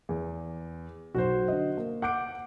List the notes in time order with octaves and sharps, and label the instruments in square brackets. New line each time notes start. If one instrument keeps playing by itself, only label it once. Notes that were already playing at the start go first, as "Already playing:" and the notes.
[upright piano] E2
[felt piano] B1 [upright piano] F#4 C5
[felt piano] D3 D#5
A#3
[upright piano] F#5 [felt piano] D6 G6 D7